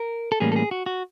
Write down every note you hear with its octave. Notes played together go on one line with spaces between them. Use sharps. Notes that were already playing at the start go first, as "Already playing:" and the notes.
Already playing: A#4
A4
A2 E3 G3 A#3 C#4 G#4
A4
G#4
F#4
F#4